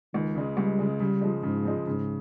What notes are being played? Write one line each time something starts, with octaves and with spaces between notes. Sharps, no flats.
C#2 D#3
C#3 G#3
C#2 G3
C#3 G#3
C#3 G3
F3 G#3
G#2 C#3
F3 G#3
G#2 C#3